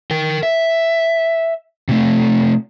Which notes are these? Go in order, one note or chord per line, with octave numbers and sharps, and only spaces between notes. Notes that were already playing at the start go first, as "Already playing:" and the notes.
A#4 G5
E5
C3 A3